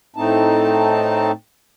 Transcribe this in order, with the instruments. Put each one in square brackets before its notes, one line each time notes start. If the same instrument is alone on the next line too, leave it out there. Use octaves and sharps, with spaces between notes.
[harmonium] A2 A3 C4 D#4 A5